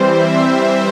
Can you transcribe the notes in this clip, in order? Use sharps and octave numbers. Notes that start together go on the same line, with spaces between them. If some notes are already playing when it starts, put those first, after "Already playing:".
Already playing: E3 G3 C4 C5
E5